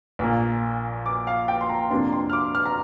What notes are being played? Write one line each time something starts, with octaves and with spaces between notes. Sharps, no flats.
A#1 A#2 A#3
D6
F5
G5
C6
A#5
F2 C3 A#3 D4 C6
C6
F6
D6
F6
A#5